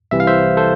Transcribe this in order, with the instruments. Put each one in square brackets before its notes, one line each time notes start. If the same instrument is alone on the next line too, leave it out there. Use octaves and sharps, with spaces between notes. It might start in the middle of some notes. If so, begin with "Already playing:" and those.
[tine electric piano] C2 C3 E3 E5
F5
C5 E5
A4 C5